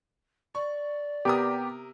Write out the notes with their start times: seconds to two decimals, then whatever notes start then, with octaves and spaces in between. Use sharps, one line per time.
0.55 D5 C#6
1.25 C3 B3 G4 A#4 D#6